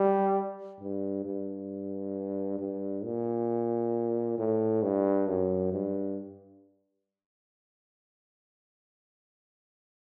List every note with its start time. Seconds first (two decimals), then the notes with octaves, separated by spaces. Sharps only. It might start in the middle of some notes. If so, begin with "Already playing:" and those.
Already playing: G3
0.80 G2
1.25 G2
2.59 G2
3.04 A#2
4.38 A2
4.83 G2
5.27 F#2
5.72 G2